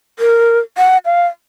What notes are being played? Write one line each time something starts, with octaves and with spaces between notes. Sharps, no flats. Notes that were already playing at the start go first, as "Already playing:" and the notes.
A#4
F#5
F5